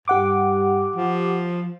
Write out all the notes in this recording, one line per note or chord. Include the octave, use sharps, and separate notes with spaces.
G2 G4 F#5 D6
F3